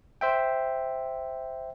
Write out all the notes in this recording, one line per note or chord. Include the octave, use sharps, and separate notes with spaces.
C5 E5 G5